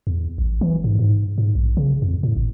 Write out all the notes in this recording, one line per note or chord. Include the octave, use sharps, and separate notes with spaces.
E2
A1
E3
G#2
G#2
G#2
A#1
C#3
F2
A2
G#1